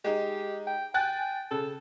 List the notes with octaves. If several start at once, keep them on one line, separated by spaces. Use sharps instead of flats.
G#3 D#4 G4
G5
G5 G#5 F#6 A6
C#3 A4